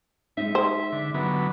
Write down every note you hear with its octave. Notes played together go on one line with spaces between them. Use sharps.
G#3 D#4 E5
C5
D3
D3 F#3 B3